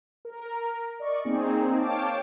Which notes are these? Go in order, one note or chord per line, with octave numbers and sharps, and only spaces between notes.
A#4
D5 D#5 C#6
A#3 C4 D#4 G#4
C#5 F5 G5 A5 D6